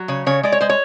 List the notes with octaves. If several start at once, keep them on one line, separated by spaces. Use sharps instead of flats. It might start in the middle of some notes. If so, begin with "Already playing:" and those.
Already playing: F#3
C#3 C#5
C#3 C#5
G#3 D5
C#5
G#3 C5
C#5